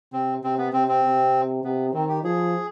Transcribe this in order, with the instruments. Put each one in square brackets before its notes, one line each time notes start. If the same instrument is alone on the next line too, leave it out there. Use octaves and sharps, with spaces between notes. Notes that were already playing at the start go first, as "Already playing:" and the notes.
[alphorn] C3 [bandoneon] C4
[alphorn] C3 [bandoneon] C4
[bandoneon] B3
[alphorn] C3 [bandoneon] C4
[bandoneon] C4
[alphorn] C3
[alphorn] C3 [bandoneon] B3
[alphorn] D#3 [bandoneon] C4
[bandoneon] G4
[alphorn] F3 [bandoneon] G#4